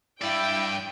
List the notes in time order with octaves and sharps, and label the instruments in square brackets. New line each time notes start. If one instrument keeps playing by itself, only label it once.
[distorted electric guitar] G2 D5 [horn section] E4 [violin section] G5